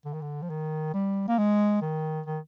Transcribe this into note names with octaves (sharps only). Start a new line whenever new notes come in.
D3
D#3
D3
F3
D#3
G3
A#3
G#3
D#3
D#3